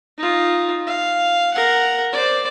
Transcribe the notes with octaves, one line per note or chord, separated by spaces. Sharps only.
D#4 F4
F5
A#4 F#5
C5 D5